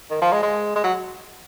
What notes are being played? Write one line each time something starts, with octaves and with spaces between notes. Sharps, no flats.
D#3
F3
G#3
G#3
G#3
F#3